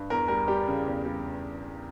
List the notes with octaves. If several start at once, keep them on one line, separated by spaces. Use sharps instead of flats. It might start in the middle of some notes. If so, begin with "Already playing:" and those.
Already playing: G2
E2 A#4
G3 A#4
G3 G4
C#3
E2
G3